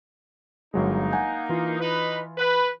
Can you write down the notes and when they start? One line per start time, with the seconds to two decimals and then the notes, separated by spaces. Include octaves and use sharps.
0.74 G1 F#3 G#3 A#3 D#4
1.12 F#5 G#5 G6
1.49 E3 F4
1.81 D#4 B4
2.38 B4